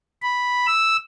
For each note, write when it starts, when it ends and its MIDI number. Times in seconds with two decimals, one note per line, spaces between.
0.22 0.67 83
0.67 0.96 88